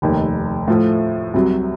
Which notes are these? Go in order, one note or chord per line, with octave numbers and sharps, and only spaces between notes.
F1 D#2 D#3
A2 F3 A3
C2 C3 F#3